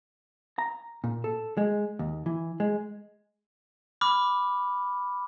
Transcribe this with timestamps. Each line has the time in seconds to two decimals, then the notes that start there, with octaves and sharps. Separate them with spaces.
0.58 A#5
1.04 A#2
1.24 A4
1.57 G#3
1.99 D#2
2.26 E3
2.60 G#3
4.01 B5 D6 F6